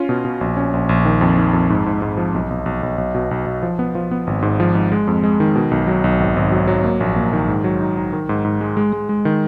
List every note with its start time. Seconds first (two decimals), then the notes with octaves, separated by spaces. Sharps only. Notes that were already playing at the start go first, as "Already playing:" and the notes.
Already playing: C#4 F4
0.09 B2
0.25 B2
0.41 A#1
0.57 C#4
0.73 A#1
0.89 A#1
1.05 D#3
1.21 F2
1.38 D#3
1.53 F2
1.70 G#2
1.86 G#2
2.02 G#2
2.17 F3
2.34 B1
2.50 B1
2.66 B1
2.83 B1
2.98 B1
3.15 B2
3.31 B1
3.46 B1
3.63 F3
3.79 B3
3.95 F3
4.11 B3
4.27 G#1
4.42 G#2
4.60 F3
4.75 G#2
4.92 G#3
5.07 F2
5.24 G#3
5.40 D#3
5.56 B2
5.71 B1
5.87 F#3
6.04 B1
6.20 G#1
6.36 G#1
6.52 F#3
6.67 F#3
6.84 A#3
7.00 A#1
7.16 A#3
7.33 D#3
7.48 G#2
7.64 F#3
7.81 D#4
7.97 D#4
8.13 D#3
8.29 G#2
8.45 G#2
8.61 G#3
8.77 G#3
8.93 G#3
9.09 G#3
9.25 D#3